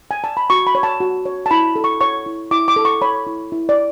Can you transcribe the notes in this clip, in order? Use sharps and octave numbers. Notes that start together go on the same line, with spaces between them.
G#5
A5
B5
F#4 C#6
B5
C#5
A5
F#4
C#5
A5
E4 B5
A4
C#6
C#5 C#6
E4
E4 D6
D6
A4
C#6
C#5 B5
E4
E4
D5